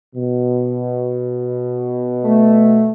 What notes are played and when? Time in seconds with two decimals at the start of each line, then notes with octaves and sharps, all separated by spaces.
0.14 B2
2.25 A3